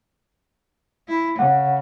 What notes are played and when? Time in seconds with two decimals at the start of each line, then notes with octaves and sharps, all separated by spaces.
1.08 E4
1.39 C#3 F#5